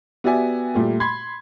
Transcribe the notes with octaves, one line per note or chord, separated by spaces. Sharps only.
B3 F#4 G4 D5 E5 G#5
A#2 G3 A3 G4
B5 C6 G#6